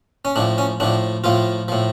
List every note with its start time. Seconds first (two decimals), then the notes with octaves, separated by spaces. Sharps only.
0.25 C#4
0.36 A2 F3 D4
0.58 C#4
0.80 A2 F3 D4
1.24 A2 F3 F4
1.68 A2 F3